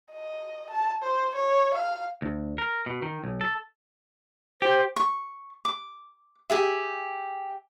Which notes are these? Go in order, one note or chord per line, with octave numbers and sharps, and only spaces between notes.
D#5
A5
C5
C#5
F5
D2
A#4
B2
D#3
B1
A4
G4 C5
C#6
D6
G4 G#4 E5